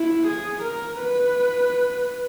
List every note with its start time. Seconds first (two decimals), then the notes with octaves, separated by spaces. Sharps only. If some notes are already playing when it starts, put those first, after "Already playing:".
Already playing: E4
0.27 G#4
0.63 A#4
1.00 B4